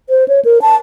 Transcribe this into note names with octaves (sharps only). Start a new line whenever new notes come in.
C5
C#5
A#4
A5